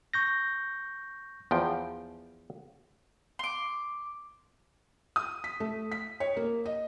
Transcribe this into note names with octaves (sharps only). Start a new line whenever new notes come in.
C#6 G6 A#6
E2 F3 G5
C6 D6
D#6
B6
A3
B6
C#5
A#3
D#5